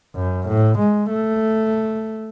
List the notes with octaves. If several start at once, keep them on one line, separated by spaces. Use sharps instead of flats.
F#2
A2
G#3
A3